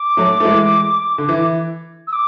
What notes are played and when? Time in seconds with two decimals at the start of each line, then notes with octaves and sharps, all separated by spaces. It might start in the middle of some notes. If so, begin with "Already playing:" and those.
Already playing: D6
0.17 F#3 A3
0.40 A3
0.45 E3 G#3
1.18 D3
1.29 E3
2.07 E6
2.13 D6